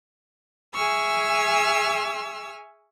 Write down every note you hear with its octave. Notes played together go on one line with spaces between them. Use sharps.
G#4 E5 G#5 C#6 E6 F6